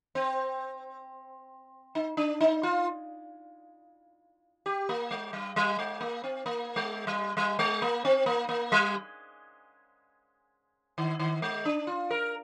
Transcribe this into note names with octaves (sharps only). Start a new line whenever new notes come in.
C4
D#4
D4
D#4
F4
G4
A#3
G#3
G3
G3
G#3
A#3
C4
A#3
G#3
G3
G3
G#3
A#3
C4
A#3
A#3
G3
D#3
D#3
G#3
D4
F4
A#4